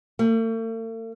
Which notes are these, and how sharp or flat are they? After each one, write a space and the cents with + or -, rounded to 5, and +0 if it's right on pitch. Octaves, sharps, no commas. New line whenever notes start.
A3 +45